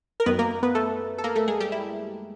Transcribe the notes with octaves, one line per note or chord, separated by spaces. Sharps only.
A#4
F#2 D#3 B3 B4
A#3 A#4
B3 B4
A3 A4
A4
A#3 A#4
A3 A4
G#3 G#4
G3 G4
E4